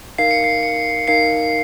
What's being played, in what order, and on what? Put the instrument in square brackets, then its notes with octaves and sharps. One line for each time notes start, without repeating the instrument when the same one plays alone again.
[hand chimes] D#4 A#4 F5 [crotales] C7
[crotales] C#7
C7
C#7
[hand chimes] D#4 A#4 F5 [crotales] C7